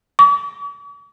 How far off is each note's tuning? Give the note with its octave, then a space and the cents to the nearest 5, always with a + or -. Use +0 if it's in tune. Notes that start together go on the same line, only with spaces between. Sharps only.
D6 -45